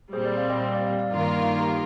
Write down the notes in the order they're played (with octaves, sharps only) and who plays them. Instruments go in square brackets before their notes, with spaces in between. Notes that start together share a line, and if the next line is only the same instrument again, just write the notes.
[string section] A#2 G3 C4 [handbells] G#4 C5
[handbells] A#4 D5
D5 F5
D#5 G5
D#5 G5
D5 F5
D5 F5
D5 F5
[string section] G2 D#3 A#3 F4 A#4
[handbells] G4